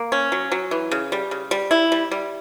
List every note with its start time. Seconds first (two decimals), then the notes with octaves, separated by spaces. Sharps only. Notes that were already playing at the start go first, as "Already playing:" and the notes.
Already playing: A#3
0.12 C#4
0.32 F#3
0.52 F#3
0.71 E3
0.91 C#3
1.12 G3
1.31 C#3
1.51 G3
1.71 E4
1.92 G3
2.11 G3